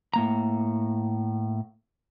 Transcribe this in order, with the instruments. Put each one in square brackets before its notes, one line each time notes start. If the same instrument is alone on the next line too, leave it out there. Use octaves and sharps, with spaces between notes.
[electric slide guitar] A2 A#3 A#5